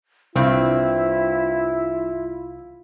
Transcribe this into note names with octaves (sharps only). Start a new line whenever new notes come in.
C2 G2 C4 E4 F4